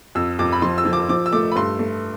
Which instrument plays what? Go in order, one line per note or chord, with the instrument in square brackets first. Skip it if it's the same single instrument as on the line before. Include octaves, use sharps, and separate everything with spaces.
[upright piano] F2 E6
F2 D6
B5
F3 C6
E6
F3
D6
F3 D6
E6
A3 D6
B5
G2 C6
A3